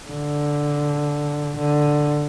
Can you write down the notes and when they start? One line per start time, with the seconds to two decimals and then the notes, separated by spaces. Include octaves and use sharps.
0.08 D3
1.57 D3